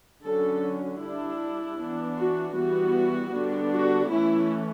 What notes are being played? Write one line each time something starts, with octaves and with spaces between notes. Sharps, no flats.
D3 F#3 C#4 A4
G3 D4 E4
E3 B3 D4
F#4
E3 G3 B3 F#4
D3 G3 B3 D4
F#4
E3 A3 C#4 E4